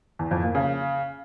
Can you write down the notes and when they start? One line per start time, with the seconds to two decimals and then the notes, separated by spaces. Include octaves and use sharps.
0.19 E2
0.31 F2
0.43 A#2
0.55 C#3